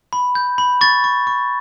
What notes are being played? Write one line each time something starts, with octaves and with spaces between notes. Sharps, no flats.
B5
G6
B5
C#6 A6
C#6
C#6